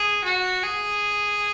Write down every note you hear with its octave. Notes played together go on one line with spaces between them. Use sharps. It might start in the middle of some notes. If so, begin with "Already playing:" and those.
Already playing: G#4
F#4
G#4